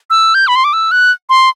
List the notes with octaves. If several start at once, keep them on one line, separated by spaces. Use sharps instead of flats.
E6
G6
B5
C6
D6
E6
F#6
C6